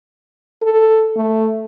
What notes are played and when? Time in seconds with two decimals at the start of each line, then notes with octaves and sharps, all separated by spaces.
0.63 A4
1.17 A3